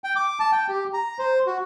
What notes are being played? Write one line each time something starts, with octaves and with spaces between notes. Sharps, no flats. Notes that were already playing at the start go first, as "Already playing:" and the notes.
G5
D6
A5
G5
G4
A#5
C5
F#4